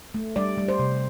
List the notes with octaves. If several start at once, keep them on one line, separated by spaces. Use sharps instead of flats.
A3
G3 D5
G3
C5
C3